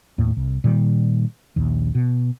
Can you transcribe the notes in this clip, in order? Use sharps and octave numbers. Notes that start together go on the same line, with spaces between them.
D#2 A2
C2
A#2 D#3 G3
A#1 D#2
B2